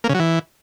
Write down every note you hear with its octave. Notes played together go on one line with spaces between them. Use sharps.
A#3
C#3
F#3
E3